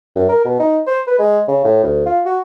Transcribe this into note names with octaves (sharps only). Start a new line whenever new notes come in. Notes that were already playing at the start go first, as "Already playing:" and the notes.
F#2
A#4
B2
D#4
C5
B4
G#3
C#3
A2
D2
F4
F#4